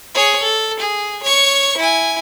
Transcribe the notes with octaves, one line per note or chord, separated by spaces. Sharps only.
G#4 C#5
A4
G#4
C#5 C#6
E4 G#5